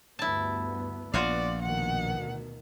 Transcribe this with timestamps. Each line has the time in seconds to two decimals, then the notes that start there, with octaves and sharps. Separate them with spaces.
0.19 D2 G2 B3 E4 A5
1.14 A#1 B3 F4 F#4 D5 F5
1.62 D2 B2 D#3 F#5